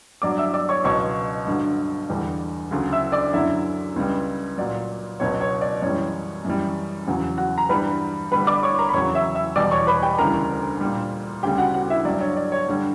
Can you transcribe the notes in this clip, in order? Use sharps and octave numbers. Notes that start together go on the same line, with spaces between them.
G2 F#3 D5 D6
E5 E6
D5 D6
C#5 C#6
C#2 B2 F#3 C#5 C#6
G2 D3 F#3
E2 D3 G3
D2 C#3 F#3
E5 E6
D5 D6
F#2 D3 F#3 E4 E5
C#2 C#3 G3
A#2 F#3 D5
C#2 B2 F#3 C#5
C#5
D5
F#2 E3 G3 C#5
F#2 E3 G3
E2 C#3 F#3
F#4 F#5
A#5
G2 E3 G3 B4 B5
G2 D3 G3 B4 B5
D5 D6
C#5 C#6
A#4 A#5
B5
E2 C#3 F#3 C#5 C#6
E5 E6
E5 E6
E2 B2 G3 D5 D6
C#5 C#6
B4 B5
G4 G5
D2 C#3 E3 G3 A#4 A#5
A#2 G3
D2 C#3 G3 G4 G5
F#4 F#5
F#4 F#5
E4 E5
G2 F#3 D5
C#5
D5
C#5
G2 D3 G3